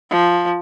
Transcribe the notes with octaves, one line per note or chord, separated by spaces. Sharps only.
F3